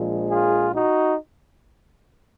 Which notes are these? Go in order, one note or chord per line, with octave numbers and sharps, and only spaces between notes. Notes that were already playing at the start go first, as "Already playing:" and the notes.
Already playing: A#1 A#2 F3 G#3
F4 G#4
D#4 F#4